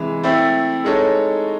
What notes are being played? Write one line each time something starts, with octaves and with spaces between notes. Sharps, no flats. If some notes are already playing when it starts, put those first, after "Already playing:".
Already playing: C3 E3 G#3
A3 C4 E4 A4
G#3 D#4 A4 C#5